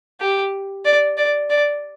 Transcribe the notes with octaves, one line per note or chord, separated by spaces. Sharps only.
G4
D5
D5
D5